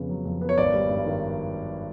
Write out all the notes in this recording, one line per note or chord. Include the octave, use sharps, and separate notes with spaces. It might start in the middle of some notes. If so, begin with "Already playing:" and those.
Already playing: F2 C#3 B3
F#3
F2
B3
C#5
G#1 D5
G3
G2
D#3